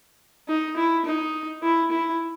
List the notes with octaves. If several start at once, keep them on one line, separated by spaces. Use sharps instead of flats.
D#4
E4
D#4
E4
E4